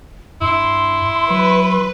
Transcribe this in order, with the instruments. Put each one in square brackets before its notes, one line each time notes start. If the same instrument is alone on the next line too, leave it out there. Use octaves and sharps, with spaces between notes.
[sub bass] G2 [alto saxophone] E4 [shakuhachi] C6
[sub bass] F#3 [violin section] B4